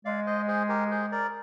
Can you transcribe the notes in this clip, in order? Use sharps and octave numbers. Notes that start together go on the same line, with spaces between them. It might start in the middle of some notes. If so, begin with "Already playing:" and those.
G#3 D5 F5
C5 D#5
G#4 C5
G4 A#4
G#4 C5
A#4 D5